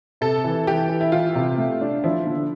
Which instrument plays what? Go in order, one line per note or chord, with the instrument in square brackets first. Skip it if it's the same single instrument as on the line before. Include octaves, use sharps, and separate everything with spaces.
[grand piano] C3 [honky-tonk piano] A4
[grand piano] E3
[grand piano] E3 [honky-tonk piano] G4
[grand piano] E3
[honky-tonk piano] E4
[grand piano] E3 [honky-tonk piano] F4
[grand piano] C3
A3
D4
[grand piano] F3 [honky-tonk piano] E4
[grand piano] D3